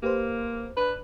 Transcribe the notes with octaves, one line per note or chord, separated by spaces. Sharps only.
A#3 G4 B4 C5
D4 B4